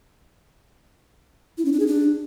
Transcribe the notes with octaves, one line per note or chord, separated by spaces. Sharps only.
E4
C#4
D4
G#4
D4